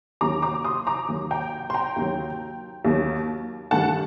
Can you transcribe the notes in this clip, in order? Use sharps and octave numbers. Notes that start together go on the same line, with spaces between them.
D#2 D#3 F#3 A#5 D6
A#5 D6
C6 D#6
A#5 D6
D#2 D#3 F#3
G5 A#5
C6
G5 A#5
D#2 D#3 F#3
D#2 D#3 F#3
G2 D#3 A3 F#5 A5